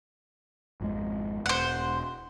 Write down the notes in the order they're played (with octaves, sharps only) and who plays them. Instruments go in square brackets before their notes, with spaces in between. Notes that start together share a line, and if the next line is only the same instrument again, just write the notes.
[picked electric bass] G#1 F2 G#3
[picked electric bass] E1 [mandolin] C5 F#5